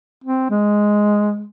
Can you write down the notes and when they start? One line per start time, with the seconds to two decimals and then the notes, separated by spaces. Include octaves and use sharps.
0.24 C4
0.51 G#3